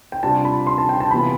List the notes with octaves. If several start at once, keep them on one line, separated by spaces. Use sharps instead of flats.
G5
C3 G3 D4 F4 A5
B5
C6
A5
G5
A5
C3 E3 B3 F4 B5